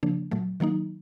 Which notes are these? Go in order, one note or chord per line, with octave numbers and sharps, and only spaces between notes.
C#3 F3 A#3 D4
A#2 F#3 A3
D#3 F#3 A#3 D#4